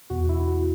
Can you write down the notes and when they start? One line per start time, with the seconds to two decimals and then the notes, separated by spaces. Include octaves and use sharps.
0.10 E2 B2 F#4
0.29 E4
0.40 E4
0.48 F#4